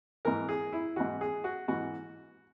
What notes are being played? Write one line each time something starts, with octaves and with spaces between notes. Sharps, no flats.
G#2 E3 A#4
G#4
E4
G#2 E3 F#4
G#4
F#4
G#2 E3 F#4